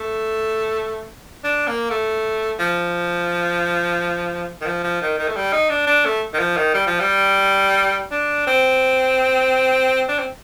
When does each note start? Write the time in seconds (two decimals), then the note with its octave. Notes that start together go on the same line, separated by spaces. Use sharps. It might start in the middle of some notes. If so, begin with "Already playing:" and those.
Already playing: A3
1.44 D4
1.67 A#3
1.90 A3
2.59 F3
4.61 D#3
4.66 F3
4.83 F3
5.01 D#3
5.18 D#3
5.28 A3
5.36 G3
5.53 D#4
5.69 D4
5.87 D4
6.05 A3
6.33 D#3
6.39 F3
6.57 D#3
6.74 G3
6.87 F3
7.00 G3
8.11 D4
8.47 C4
10.09 D4
10.19 C4